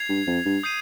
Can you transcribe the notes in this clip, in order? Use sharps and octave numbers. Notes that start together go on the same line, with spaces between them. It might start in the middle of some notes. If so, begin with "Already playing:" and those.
Already playing: G#6 C7 F7
G2
F2
G2
D#6 G6 C7 D#7